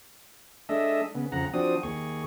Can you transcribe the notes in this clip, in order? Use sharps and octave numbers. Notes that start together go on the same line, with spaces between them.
G#3 D4 A4 D#5 E5
C#3 B3
F2 C#3 F#5 A#5
F3 C4 D4 F#4 D#6
D#2 G#4 C#6